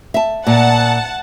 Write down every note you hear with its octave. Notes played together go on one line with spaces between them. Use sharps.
E5 A5
A#2 F#5 A5